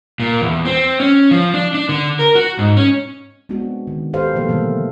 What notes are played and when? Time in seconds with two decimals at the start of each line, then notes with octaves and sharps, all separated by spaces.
0.20 A#2
0.41 E2
0.65 C4
1.00 C#4
1.31 F3
1.54 D4
1.74 D4
1.89 D3
2.19 A#4
2.35 F#4
2.59 G#2
2.77 C#4
3.49 G#3 B3 C4 D4 F#4
3.87 D#3
4.13 G4 A4 B4 C5 F5
4.34 B2 F3 F#3 A#3 A4 C5
4.48 B2 D3 E3 F#3 G3 A3